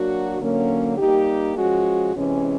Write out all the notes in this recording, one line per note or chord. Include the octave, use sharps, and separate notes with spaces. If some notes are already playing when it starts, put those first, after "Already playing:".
Already playing: F#3 A#3 D4 F#4
D3 F#3 A#3 C#4
G3 A#3 D#4 G4
F3 G#3 C#4 F#4
C3 E3 G#3 C#4